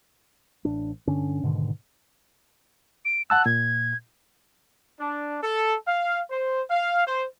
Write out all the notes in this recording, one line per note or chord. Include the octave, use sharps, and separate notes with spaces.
A1 D4
G2 D3 C#4 D4
G#2 B2 D3 D#3
D7
F#5 A5 E6 F#6
A#2 G#6
D4
A4
F5
C5
F5
C5